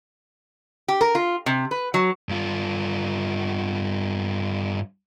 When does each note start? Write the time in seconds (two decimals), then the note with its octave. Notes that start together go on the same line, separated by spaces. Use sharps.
0.88 G4
1.01 A#4
1.15 F4
1.46 C3
1.71 B4
1.94 F#3
2.29 G2 F4